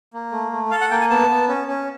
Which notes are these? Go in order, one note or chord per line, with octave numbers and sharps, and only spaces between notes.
A#3
A3
A3
A4 F5
F#5
A#3 G5
G#5
B3 A5
B3
C#4
C#4